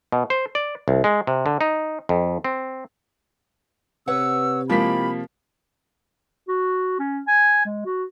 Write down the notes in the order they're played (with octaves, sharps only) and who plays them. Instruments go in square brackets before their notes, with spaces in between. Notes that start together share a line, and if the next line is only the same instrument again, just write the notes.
[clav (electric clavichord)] B2
C5
D5
C2
G#3
C3
D3
D#4
F2
C4
[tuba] C3 [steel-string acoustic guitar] B4 C#5 F#5 [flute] E6
[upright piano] F3 A#3 B6 [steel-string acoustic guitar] G#3 E4 G4 [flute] B5
[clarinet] F#4
C#4
G#5
G#3
F#4